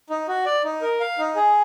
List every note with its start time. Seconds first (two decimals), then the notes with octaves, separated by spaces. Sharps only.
0.10 D#4
0.28 F#4
0.46 D5
0.64 D#4
0.82 A#4
1.00 F5
1.19 D#4
1.36 G#4